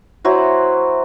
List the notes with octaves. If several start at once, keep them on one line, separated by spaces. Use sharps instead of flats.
F#3 E4 F#4 C5